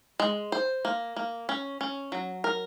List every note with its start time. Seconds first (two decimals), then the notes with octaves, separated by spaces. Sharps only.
0.20 G#3
0.52 C5
0.85 A#3
1.16 A#3
1.49 C#4
1.81 C#4
2.12 F#3
2.44 A#4